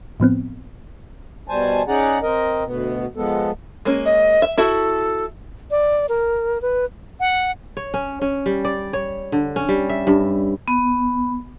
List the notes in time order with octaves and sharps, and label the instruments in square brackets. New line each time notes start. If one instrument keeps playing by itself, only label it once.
[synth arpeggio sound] A2 F3 B3 C4
[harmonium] B2 G3 C5 G#5 A5
C#4 D#4 G#4 D5 F#5 A#5
C4 A#4 D#5
D2 B2 B3
F3 G#3 B3 A4
[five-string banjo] G#3 A#3 C#4
[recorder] D#5
[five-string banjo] E5
[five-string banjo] E4 F#4 E5 [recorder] A4
[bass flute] D5
A#4
B4
[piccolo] F#5
[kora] C#5
C#4
C#4
G3
D5
C#5
D3
C#4
G3
E5
G2
[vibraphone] B3